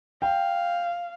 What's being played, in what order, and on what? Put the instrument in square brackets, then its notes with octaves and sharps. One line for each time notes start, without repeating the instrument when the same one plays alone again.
[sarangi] F5 [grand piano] G5